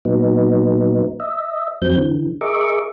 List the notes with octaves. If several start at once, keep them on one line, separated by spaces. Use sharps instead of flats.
A#2 F#3 B3 D#4
D#5 E5
F2 F#3 C4 G6
D3 E3
G#4 A#4 D#5 E5 C#6 D6